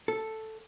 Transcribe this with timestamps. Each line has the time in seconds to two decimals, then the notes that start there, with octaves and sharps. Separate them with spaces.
0.08 A4